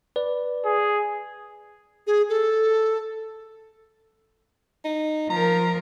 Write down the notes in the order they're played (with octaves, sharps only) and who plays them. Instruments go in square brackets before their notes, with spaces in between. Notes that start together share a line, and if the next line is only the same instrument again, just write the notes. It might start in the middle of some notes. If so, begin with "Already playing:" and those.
[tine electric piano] B4 D5
[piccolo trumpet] G#4
[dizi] G#4
A4
[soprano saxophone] D#4
[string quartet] F3 A#4 [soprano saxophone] A#5